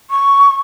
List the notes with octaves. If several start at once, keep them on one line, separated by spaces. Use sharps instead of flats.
C#6